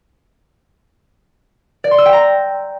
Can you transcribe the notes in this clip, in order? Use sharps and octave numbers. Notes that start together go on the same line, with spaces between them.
D5
C6
E6
G5
A#5